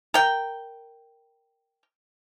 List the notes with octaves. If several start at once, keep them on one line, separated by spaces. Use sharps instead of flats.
A#4 G5